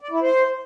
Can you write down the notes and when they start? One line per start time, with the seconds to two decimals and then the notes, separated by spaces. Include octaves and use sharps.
0.01 D5
0.11 E4
0.22 C5